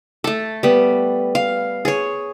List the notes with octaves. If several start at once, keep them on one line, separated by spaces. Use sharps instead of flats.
A3 A4
G3 B3
F5
G#4 C#5